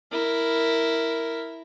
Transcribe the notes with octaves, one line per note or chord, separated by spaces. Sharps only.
E4 A#4